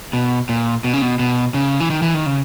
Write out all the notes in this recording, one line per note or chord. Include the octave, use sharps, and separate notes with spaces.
B2
A#2
B2
C#3
B2
B2
C#3
E3
D#3
E3
D#3
C#3